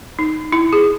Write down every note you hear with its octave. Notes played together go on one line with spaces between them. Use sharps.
D#4
E4
G#4